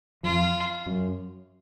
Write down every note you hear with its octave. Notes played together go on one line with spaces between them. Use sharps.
F2 F3 F4
F#2 F#3